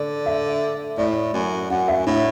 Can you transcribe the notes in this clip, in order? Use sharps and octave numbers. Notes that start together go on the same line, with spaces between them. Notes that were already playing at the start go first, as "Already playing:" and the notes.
Already playing: D3 D5
E5
A2 D5
F#2
F#2 F#5
E5
A2 D4